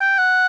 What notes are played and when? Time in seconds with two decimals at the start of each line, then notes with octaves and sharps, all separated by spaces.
0.01 G5
0.18 F#5